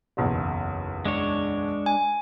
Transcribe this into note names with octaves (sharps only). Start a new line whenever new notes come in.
F#1 B1 E2
G#3 D4 C#5
G#5